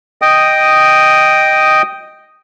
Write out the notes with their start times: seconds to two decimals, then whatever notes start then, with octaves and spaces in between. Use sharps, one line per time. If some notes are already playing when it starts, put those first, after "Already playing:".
0.22 D#5 G5 D#6